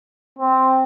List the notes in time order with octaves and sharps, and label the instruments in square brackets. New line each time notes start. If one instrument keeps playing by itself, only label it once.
[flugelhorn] C4